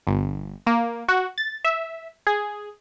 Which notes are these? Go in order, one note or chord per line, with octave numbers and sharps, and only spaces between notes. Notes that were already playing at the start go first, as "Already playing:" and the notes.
G1
A#3
F#4
A6
E5
G#4